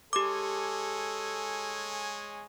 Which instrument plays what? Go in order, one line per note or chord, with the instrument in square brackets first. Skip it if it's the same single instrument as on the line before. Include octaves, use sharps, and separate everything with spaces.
[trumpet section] G#3 C#5 G#5 [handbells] G4 D6 [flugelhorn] A4